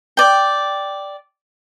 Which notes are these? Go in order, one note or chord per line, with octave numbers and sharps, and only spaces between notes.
D5 G5